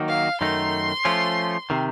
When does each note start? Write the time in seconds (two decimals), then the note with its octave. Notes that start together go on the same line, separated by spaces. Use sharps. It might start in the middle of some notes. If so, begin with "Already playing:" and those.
Already playing: D#3 F#3 A#3 D#4 F#4
0.08 F5
0.41 F#2 D#3 A3 D#4 C6
1.05 F3 A3 C#4 F4
1.70 C3 D#3